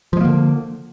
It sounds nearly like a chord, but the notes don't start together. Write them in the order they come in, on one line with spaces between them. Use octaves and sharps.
F3 G#3 A#3 D3